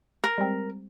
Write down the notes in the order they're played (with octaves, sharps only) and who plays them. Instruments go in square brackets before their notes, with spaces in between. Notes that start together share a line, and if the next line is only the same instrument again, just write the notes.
[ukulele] A#4
[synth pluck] G3 G#3 C4